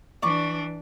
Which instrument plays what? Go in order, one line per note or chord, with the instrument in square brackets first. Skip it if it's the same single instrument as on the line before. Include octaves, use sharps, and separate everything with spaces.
[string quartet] E3 D4 [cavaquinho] D5 C#6 D6